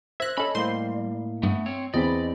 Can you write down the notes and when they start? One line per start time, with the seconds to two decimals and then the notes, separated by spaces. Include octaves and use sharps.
0.20 C5 E5 F#6 G#6 A#6
0.38 C#4 A4 D#5 B5
0.55 A2 G3 A#3 C5 C6
1.43 G2 A3 B3
1.66 C4 C#5
1.94 E2 B3 C4 D5 D#5 B5